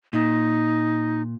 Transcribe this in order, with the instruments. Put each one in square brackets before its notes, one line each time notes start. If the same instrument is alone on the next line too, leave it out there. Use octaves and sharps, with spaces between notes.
[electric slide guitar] A#2 [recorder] D#4